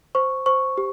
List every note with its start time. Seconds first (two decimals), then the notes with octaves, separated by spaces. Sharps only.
0.15 C5 C#6
0.46 C5 C#6
0.78 G4